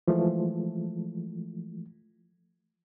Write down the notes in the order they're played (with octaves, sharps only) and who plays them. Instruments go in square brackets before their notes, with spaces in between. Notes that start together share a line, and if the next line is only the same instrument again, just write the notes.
[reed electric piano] E3 F3 G#3 A3